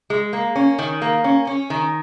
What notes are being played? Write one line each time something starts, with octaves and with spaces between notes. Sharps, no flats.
G#3
A#3
C#4
D#3
A#3
C#4
C#4
D#3